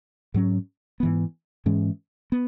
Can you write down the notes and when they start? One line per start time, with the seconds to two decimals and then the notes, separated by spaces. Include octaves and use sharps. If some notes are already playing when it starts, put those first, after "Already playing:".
0.34 G#2 F#3 C#4
1.00 G#2 E3 B3
1.66 G#2 E3 G#3 C#4
2.32 B3